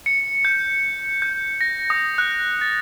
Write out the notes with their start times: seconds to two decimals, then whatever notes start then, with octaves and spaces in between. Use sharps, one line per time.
0.06 C#7
0.45 G6
1.22 G6
1.61 A#6
1.90 D#6
2.18 F#6
2.61 A6